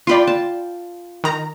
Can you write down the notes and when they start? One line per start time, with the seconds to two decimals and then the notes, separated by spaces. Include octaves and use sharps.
0.07 F4 D5 G5 B5 C6
0.27 A5
1.24 D#3 A#5